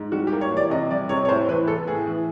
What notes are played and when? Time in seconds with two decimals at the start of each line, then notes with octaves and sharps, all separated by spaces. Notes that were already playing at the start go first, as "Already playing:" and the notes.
Already playing: G#2
0.12 G3 F#4
0.27 G4
0.32 A#3
0.41 C#5
0.51 E3
0.57 D5
0.70 C3 D#5
0.90 G3 D5
1.09 C3 C#5
1.25 C#5
1.29 A2 C5
1.48 E3 B4
1.67 B3 A4
1.87 A2 G#4
2.06 E3